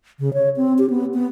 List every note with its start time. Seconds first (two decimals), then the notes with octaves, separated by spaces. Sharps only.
0.19 C#3
0.34 C#5
0.57 C4
0.78 G4
0.90 B3
1.14 B3